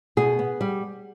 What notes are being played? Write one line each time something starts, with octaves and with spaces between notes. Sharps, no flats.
B2 G#4
B3
G3